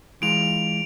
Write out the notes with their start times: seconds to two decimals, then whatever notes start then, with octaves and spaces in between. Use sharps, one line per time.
0.22 E3 G#3 F4 D7 F7